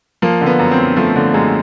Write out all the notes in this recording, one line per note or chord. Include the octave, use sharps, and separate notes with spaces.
F3 A#3
D3
B3
F#2
C4
F#2
F3 A3
D3
F#2 G#3